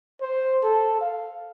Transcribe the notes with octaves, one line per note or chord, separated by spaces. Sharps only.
C5
A4
F5